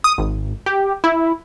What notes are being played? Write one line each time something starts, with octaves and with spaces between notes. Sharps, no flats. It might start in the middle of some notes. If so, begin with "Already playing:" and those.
D#6
G#1
G4
E4